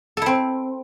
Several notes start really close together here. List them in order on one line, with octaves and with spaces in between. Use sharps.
A4 E4 C4